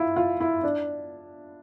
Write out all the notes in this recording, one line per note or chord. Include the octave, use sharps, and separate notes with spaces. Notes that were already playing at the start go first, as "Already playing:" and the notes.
Already playing: E4 F4
F4
E4
D4